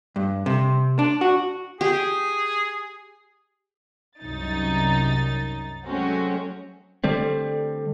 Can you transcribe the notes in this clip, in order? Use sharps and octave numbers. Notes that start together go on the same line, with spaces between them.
G2
C3
D4
F#4
G4 G#4
C2 F#2 D#4 A6
F#3 G#3 A3 C4 C#4 F#4
D3 G3 A3 C4